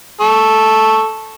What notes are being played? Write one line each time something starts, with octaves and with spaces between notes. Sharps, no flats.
A4 C#6